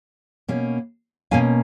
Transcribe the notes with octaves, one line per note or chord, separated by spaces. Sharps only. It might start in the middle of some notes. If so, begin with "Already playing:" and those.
B2 A#3 C#4
B2 A#3 C#4 F5 G#5